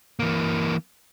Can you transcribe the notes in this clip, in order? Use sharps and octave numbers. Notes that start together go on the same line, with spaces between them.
E3 A#3